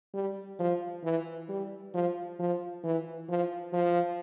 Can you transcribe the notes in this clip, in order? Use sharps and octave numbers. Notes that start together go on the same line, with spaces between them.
G3
F3
E3
G3
F3
F3
E3
F3
F3